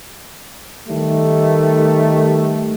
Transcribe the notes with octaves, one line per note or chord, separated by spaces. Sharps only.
D#3 G3 A3